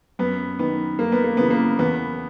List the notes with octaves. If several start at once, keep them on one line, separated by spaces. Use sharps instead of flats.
F#2 B3
D#3 B3
F#2 A#3
B3
A#3
C#3 E3 B3
A#3
E2 B3